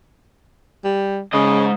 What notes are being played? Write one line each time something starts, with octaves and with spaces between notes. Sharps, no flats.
G3
G#2 C#3 D#5